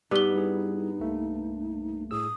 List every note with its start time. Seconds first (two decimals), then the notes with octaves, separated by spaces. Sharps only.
0.11 G2 B3 D#4 G4 B4 G7
0.35 G3 E4 G#4
1.00 C2 A3 A#3
2.11 A2 G#4 D#6 E6